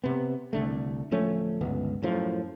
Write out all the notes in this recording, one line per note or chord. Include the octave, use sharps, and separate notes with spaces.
C3 B3
C2 D3 A3
D1 F3 A3 C#4
G1 C#2 B3
F#2 A2 F3